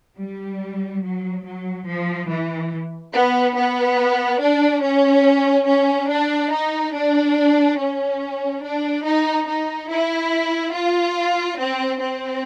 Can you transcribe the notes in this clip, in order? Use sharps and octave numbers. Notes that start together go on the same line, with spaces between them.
G3
F#3
F#3
F3
E3
B3
B3
D4
C#4
C#4
D4
D#4
D4
C#4
D4
D#4
D#4
E4
F4
C4
C4